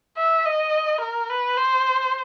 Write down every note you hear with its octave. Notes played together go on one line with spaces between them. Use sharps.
E5
D#5
A#4
B4
C5